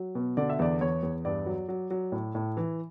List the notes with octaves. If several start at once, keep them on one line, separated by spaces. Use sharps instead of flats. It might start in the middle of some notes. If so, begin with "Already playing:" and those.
Already playing: F#3
B2
D3 D5
E5
E2 D5
E2 C#5
E2
G2 D5
F#3
F#3
F#3
A2
A2
E3